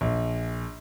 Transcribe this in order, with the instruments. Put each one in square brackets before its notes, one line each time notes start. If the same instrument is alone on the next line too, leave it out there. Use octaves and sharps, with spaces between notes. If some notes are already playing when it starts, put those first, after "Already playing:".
[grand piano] A#1